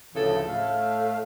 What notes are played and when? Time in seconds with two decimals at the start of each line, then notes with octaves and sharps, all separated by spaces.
0.13 D2 A2 C#3 E3 F3 A4
0.47 A2 A3 F5